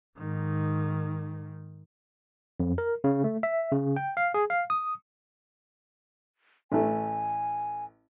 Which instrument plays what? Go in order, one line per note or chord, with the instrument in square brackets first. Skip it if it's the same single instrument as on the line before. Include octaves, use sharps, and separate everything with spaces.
[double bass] G#2 D#3
[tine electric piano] F2
A#4
C#3
A3
E5
C#3
G5
F5
G#4
F5
D#6
[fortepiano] A1 A3 [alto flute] G#5